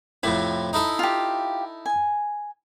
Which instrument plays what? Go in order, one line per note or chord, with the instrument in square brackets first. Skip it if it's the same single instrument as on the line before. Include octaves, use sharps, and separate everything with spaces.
[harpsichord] F2 A2 C3 [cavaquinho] E4
[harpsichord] D#4 E4 A4
[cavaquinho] F4 G4
G#5